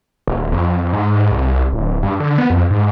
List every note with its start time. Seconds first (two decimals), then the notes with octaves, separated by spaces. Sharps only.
0.27 D#1
0.52 F2
0.93 G#2
1.31 C2
1.73 D1
2.03 G2
2.20 D3
2.38 B3
2.50 F2
2.70 G#2